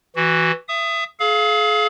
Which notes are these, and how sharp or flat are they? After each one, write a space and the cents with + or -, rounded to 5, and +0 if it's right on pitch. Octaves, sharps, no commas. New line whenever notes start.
E3 +0 F#4 +0
E5 +25 D#6 +0
G#4 +40 F5 +0